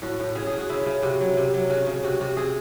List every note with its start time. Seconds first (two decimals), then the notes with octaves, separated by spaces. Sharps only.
0.02 A2 F#4
0.20 A2
0.35 C#3 G#4
0.47 G#4
0.52 C#3
0.58 F#4
0.69 C#3 E4
0.86 C#3
1.03 C3 F#4
1.20 F#3
1.37 C3
1.54 F#3
1.70 C#3 F#4
1.87 C#3
2.03 C3 F#4
2.20 C3 F#4
2.37 C3 G#4